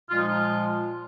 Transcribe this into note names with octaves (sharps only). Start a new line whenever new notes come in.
A#2 F3 G#3 F4
D#4
F4